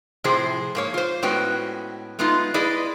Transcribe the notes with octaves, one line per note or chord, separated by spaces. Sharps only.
A2 C3 F3 G#4 C5
G#2 A#3 C#5
F4 C5
A2 G#3 B3 C#4 F#4 G5
G#3 A3 B3 D#4 F4
E4 G#4 B4 D5 D#5